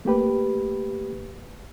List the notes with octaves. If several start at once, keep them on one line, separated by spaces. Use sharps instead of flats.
A3 A#3 G4 B4